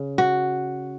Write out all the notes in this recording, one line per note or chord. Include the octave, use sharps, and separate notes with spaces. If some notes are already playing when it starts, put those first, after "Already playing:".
Already playing: C#3
F#4